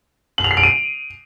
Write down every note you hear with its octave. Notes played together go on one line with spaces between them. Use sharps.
F#7
F7
C7
D7
D#7